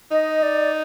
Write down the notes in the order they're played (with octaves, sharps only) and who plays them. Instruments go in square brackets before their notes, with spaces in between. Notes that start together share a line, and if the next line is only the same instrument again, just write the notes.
[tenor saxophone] D#4 [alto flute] D#5
[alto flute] D5